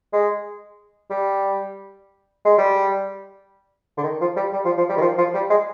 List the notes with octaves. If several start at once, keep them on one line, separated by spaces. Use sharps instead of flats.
G#3
G3
G#3
G3
D3
D#3
F3
G3
G3
F3
F3
G3
D#3
F3
F3
G3
G#3